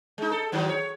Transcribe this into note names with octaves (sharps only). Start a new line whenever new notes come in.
G#3 D#4
A4
G#2 D#3 F#3
C#5